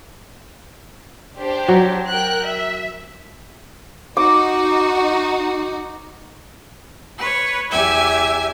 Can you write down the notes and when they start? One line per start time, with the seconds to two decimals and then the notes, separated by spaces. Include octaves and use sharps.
1.37 D4 G4 C5
1.68 F#3
2.09 A#4 G5 F#6
2.44 E5
4.17 D#4 F#4 D6
7.19 B4 C#5
7.71 E2 G4 E5 G#5 G#6